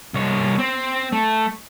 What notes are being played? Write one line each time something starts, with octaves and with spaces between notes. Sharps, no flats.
C2 C#5
C4
A3